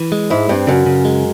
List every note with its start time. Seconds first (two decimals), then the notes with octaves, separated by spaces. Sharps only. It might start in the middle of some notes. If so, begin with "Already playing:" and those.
Already playing: E3
0.12 G#3
0.30 G#2 E4
0.49 G2 C4
0.67 F#2 C#3
0.86 C#3
1.05 G#3